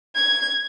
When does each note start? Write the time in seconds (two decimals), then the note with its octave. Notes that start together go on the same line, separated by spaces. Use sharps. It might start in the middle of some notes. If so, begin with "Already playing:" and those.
0.16 G#6